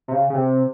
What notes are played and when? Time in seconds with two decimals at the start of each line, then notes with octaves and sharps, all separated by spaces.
0.08 C3
0.13 C#3
0.30 C#3
0.35 C3